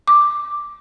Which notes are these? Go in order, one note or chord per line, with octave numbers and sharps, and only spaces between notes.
D6